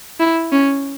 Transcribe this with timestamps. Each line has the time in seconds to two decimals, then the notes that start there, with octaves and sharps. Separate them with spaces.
0.20 E4
0.52 C#4